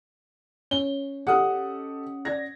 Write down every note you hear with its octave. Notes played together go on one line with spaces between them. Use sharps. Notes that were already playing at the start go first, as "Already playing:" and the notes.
C#4 G7
G4 A4 D#5 F#5 D#6
D5 G#6 A#6